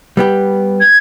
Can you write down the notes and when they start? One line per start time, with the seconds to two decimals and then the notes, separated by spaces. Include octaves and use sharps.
0.17 G3 B3 G4
0.80 G#6